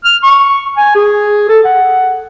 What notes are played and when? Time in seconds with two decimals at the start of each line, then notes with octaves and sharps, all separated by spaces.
0.05 F6
0.23 C#6
0.77 G#5
0.95 G#4
1.49 A4
1.65 F#5